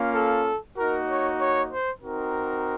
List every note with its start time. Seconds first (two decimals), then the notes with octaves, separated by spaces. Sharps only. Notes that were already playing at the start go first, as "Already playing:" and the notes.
Already playing: A#3 C#4 F4
0.15 A4
0.77 A#3 D#4 F#4 A#4
1.08 C#5
1.40 C#5
1.71 C5
2.02 C4 D#4 F#4 A#4